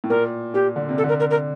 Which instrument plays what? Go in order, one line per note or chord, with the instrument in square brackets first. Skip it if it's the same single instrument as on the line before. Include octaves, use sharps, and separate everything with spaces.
[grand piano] A2
[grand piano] A#2 [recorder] A#4
[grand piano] A#2 [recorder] G4
[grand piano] D3
C3
[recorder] A4
[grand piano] D3 [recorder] A#4
[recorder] A#4
A#4